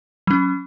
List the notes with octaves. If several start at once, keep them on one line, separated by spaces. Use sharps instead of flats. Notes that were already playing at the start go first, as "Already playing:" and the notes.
F#3 C#4